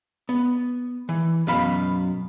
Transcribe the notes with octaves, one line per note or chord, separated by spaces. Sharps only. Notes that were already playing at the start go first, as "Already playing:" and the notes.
B3
E3
F#2 B2 F5 B5